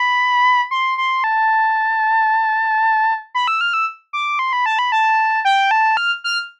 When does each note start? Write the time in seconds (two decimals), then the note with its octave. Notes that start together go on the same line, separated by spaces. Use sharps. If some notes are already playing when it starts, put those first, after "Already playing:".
Already playing: B5
0.71 C6
0.98 C6
1.24 A5
3.35 B5
3.47 E6
3.61 F6
3.74 E6
4.13 D6
4.39 C6
4.53 B5
4.66 A5
4.79 B5
4.92 A5
5.45 G5
5.71 A5
5.97 F6
6.24 F6